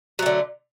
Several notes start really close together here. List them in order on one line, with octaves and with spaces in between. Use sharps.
F#3 A3 D3